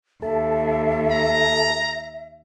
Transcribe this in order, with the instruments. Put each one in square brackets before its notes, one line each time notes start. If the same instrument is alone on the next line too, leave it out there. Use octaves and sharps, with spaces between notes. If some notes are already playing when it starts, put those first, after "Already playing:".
[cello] D#2 [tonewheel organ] A4 A5 [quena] E5
[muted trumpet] A#5